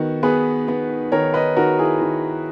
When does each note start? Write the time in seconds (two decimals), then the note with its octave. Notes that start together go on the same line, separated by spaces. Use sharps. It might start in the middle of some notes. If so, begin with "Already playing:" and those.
Already playing: D#3 B3 F#4
0.23 B3 G#4 B4
0.68 B3
1.12 D#3 A#4 C#5
1.34 B4 D#5
1.56 D#3 F#4 A#4
1.79 E4 G#4
2.01 D#3